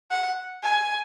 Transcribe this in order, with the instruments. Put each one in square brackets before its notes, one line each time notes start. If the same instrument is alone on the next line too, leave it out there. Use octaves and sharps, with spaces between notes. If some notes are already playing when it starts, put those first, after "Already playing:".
[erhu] F#5
G#5